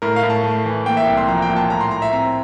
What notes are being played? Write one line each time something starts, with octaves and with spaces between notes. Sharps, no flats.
A2 A#4
F5
A2
A5
A3
E3
A#3 G5
E5
C2 G5
C6
F3 A#5
G5
A#2
A5
A2 A#5
C6
A2 A#5
E5
C4 A#5